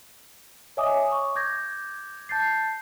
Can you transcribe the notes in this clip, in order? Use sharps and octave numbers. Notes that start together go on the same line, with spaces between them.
C#5 D#5 E5 G#5 D6 D#6
C#6
D6 G6 G#6 A#6
A5 G6 A6 C7